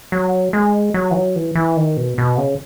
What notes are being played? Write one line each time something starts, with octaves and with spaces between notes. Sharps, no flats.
F#3
G#3
F#3
E3
F#3
E3
E3
D#3
B2
B2
C#3